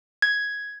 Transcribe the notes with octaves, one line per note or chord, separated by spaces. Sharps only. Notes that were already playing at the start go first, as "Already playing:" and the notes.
G#6